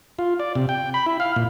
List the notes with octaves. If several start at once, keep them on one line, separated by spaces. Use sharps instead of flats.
F4
D5
C3
G5
B5
E4
F5
A#2